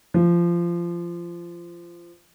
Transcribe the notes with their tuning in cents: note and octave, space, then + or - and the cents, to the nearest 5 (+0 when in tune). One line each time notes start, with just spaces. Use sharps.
F3 -20